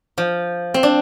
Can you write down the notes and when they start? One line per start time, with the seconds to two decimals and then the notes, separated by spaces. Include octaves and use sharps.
0.18 F3
0.74 C4
0.83 D4